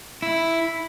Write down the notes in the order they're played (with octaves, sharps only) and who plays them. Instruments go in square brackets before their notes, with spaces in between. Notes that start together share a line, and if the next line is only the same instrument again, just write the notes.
[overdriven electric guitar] E4